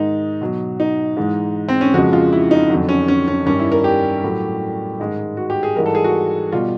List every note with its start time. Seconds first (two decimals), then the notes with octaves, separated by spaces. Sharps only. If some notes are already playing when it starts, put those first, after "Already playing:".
Already playing: G#2 D#3 G#3 D#4
0.41 B2 F#3
0.80 D#4
1.17 G#2 E3 G#3
1.68 C4
1.81 C#4
1.94 F2 C#3 F3 G#3 F#4
2.13 F4
2.32 E4
2.51 D#4
2.70 F2 D3 F#3
2.89 C#4
3.08 C#4
3.28 C#4
3.46 G2 D#3 G3 C#4
3.59 E4
3.72 A#4
3.84 G4
4.24 A2 F#3
5.00 G#2 D#3 G#3
5.37 F#4
5.50 G4
5.63 G#4
5.76 G#2 E3 G3 A#4
5.86 A4
5.95 G#4
6.04 F#4
6.52 B2 G3 F4